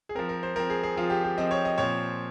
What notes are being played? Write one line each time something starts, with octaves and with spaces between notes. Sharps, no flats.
G#4
F3 C4 A#4
A#4
C5
F3 C4 A#4
G#4
G#4
F3 C4 F4
G4
G4
F3 C4 D#5
C#5
D#5
A#2 F3 C4 C#5